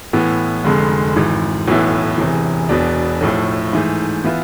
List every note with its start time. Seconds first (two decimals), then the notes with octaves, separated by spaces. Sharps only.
0.13 A2 E3 B3
0.64 F1 F2 D3 G#3
1.16 G#1 G#2 E3
1.68 B1 A2 E3 B3 E4
2.18 E1 E2 C3 E3
2.69 E1 E2 B2 B3 D4
3.21 B1 A2 F3 A3
3.73 G#2 E3 A3
4.24 E3 B3 F4 B4 E5